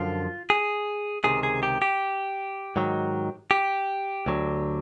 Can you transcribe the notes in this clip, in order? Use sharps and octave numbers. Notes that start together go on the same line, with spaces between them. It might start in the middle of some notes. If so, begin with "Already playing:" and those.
Already playing: F#2 D3 F3 F4
G#4
C#2 C3 D#3 G#4
G#4
G4
G4
G#2 D#3 F#3
G4
D2 D3 F#3